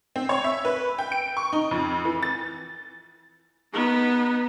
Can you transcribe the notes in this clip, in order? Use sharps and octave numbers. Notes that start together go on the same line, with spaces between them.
C4
C#5
E5
B4
G5
D7
C#6
D#4
F2
E3
A6
B3 D#4